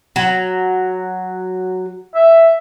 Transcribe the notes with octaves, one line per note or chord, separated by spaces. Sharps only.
F#3
E5